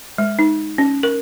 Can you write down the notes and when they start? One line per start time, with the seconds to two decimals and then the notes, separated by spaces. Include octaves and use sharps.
0.18 G#3
0.39 D#4
0.78 C#4
1.03 A#4